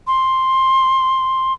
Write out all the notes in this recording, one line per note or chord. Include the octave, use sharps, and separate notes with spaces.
C6